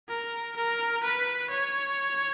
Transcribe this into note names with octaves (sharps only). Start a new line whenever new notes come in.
A#4
A#4
B4
C#5